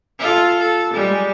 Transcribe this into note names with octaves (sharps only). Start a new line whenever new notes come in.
F4 A4
A4
G3 G#3